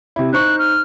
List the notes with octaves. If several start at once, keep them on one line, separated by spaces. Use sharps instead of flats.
C3 E4
D#4 C5 C#6 F#6
F6